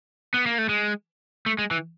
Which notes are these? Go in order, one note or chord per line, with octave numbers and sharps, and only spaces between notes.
B3
A#3
A3
G#3
A3
G#3
E3